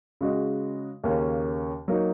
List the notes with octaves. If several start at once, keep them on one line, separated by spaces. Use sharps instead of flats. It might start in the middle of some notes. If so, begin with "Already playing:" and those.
C#3 G#3 F#4 D#5
D#2 C#3 A#3 C#4
F#3 A#3 D#4